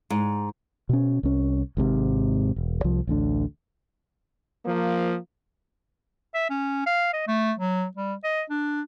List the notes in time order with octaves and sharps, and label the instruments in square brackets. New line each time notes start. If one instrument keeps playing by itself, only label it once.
[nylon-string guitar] G#2
[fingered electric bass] B2 C#4
C2 C#4
G#1 G#2 C3
E1
C2 F3
A1 D2 D3
[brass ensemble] F3 A#3
[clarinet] E5
C#4
F5
D#5
A3
F#3
G3
D#5
D4